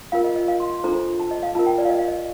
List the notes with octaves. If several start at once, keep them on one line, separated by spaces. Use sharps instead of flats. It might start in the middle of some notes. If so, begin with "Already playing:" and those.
F4 A#4 F5
D#5
D#5
F5
C6
C6
D4 F4 A4 C5 A#5
A5
D#5
F5
F4 A#4 A5
G5
D5
F5
D#5
F5
D#5